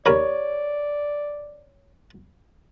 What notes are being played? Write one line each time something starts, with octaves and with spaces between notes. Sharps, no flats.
D#2 A#4 C#5 D5 B5